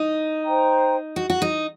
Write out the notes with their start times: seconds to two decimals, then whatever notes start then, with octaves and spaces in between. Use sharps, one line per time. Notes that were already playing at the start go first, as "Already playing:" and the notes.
Already playing: D#4
0.43 C5 G5 A#5
1.16 F#4
1.30 F#4
1.42 D#4